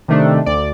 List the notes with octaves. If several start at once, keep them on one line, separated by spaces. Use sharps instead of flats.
C3 D#3 A3 D4
D2 D5